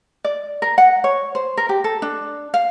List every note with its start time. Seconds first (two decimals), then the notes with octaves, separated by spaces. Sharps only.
0.25 D5
0.62 A#4
0.78 F#5
1.04 C#5
1.35 C5
1.57 A#4
1.69 G4
1.84 A4
2.02 D4
2.54 F5